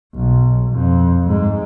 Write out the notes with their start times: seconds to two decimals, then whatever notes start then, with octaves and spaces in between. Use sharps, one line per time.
0.15 B1
0.73 F2
1.27 G#2